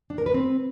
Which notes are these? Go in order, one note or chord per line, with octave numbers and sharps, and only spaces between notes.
D4
A#4
B4
C4